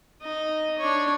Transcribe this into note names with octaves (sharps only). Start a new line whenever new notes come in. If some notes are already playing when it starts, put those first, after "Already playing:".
D#4 D#5
D4 C#5